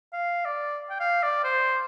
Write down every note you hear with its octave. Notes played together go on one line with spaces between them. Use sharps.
F5
D5
G5
F5
D5
C5